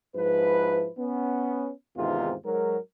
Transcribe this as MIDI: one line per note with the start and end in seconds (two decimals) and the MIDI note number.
0.16 0.89 44
0.16 0.89 53
0.16 0.89 64
0.16 0.89 71
0.98 1.70 59
0.98 1.70 61
1.96 2.35 40
1.96 2.35 44
1.96 2.35 48
1.96 2.35 51
1.96 2.35 60
1.96 2.35 65
2.44 2.77 44
2.44 2.77 54
2.44 2.77 70